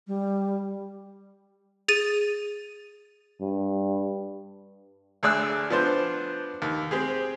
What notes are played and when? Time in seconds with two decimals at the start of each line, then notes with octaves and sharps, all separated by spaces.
0.07 G3
1.88 G#4 A6 D#7
3.41 G2
5.23 D2 G#4 D5 E6 F#6
5.70 F3 B3 D4 C5
6.62 D#2
6.91 C4 G4 G#4